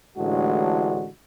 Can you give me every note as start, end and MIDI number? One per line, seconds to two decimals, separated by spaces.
0.18 1.07 33
0.18 1.07 45
0.18 1.07 50
0.18 1.07 56
0.18 1.07 62
0.18 1.07 66